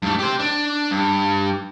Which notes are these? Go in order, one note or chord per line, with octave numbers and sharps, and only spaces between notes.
G2 A3
G4 C5
D4
G2